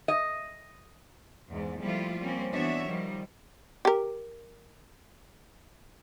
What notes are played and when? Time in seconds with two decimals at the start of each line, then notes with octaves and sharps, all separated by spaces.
0.08 D#5
1.49 E2 G#2
1.81 F3 G3 A3 A#3 E4 F4
2.19 G3 A#3 C4 C#4
2.51 E3 B3 D4 F#4 C#5 E5
2.88 D#3 F3 G3
3.85 G4 A#4